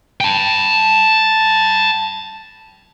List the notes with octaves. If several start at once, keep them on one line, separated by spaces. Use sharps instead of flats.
G5 A5